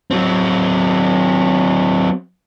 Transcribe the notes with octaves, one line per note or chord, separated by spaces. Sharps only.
F#3 C4